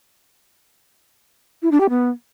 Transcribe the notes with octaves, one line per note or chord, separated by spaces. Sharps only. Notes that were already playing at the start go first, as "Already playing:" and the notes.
E4
D4
G4
B3